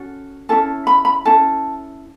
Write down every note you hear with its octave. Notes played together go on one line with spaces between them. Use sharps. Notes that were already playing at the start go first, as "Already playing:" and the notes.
Already playing: C#4 F#4 A4
C#4 E4 A4 A5
B5
B5
C#4 E4 A4 A5